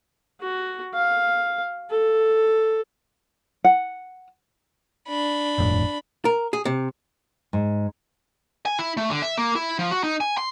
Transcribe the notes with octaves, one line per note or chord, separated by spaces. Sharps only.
F#4
F5
A4
F#5
D4 B5
G1 F2 A2
A#4
G#4
C3
G#2
G#5
E4
A3
D3
E5
A#3
E4
F3
F#4
D#4
G#5
C6